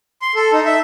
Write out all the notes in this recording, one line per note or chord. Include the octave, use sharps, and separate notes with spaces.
C6
A4
D#4
E5